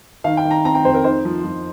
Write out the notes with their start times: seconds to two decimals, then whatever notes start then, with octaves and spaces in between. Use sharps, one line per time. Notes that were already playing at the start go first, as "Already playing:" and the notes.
0.24 D#3 F5
0.37 G5
0.45 D#3
0.51 A#5
0.64 C4 A#5
0.75 G5
0.84 F2 C5
0.94 A#4
1.04 D#4 C5
1.25 F3
1.44 F3